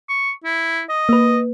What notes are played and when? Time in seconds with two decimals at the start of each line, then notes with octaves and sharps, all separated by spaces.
0.09 C#6
0.44 E4
0.89 D#5
1.09 A#3 B4